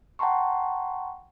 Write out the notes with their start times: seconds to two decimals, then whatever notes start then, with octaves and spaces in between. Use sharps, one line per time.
0.19 F#5 G5 A5 A#5 C6 C#6